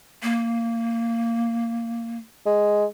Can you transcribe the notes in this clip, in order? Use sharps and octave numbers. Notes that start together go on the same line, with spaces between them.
A#3
G#3